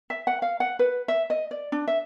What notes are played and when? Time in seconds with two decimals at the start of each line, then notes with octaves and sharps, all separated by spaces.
0.10 E5
0.27 F#5
0.42 F5
0.60 F#5
0.79 B4
1.08 E5
1.30 D#5
1.51 D5
1.72 D4
1.88 E5